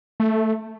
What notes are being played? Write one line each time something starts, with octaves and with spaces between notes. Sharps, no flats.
A3